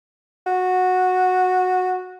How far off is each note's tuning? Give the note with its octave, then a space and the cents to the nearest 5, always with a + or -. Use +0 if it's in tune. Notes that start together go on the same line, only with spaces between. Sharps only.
F#4 -10